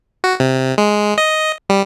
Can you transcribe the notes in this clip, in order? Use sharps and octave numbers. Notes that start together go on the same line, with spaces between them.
F#4
C3
G#3
D#5
G3